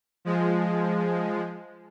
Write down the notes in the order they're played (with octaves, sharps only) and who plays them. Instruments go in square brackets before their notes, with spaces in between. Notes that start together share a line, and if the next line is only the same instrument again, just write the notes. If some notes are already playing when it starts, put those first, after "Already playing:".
[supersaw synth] F3 G#3